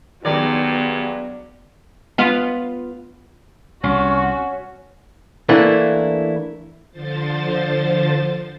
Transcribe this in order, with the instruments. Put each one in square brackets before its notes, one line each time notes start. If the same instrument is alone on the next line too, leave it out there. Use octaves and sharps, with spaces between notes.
[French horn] G2 [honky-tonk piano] D#3 F#3 G#3 [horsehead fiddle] B3 F#4 [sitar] D5
[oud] B3 F4
[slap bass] C2 [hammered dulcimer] C#4 [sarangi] F#4
[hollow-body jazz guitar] E3 A3 A#3 D4 E4
[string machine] D3 F3 C5 A6